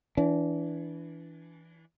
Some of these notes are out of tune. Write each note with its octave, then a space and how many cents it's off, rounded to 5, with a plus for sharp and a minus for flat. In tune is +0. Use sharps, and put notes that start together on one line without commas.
E3 +0 D4 -25